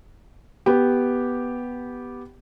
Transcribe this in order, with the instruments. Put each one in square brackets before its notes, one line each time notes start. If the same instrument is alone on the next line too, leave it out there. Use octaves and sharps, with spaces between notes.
[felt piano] B3 G4